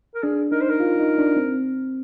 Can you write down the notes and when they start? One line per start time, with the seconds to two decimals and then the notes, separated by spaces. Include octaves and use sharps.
0.15 A#4
0.23 D4 G#4
0.52 D#4 A#4
0.61 C5
0.69 A#4
0.80 F4
1.00 D#4
1.18 D4
1.36 C4